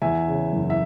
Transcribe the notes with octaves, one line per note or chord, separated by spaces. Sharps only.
E2 E5 G#5
C#3
F#1
E5